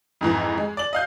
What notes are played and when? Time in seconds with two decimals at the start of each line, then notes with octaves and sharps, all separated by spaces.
0.21 F2 G#2 E3
0.58 G#3
0.77 D5 F#7
0.93 D#5 F5 G6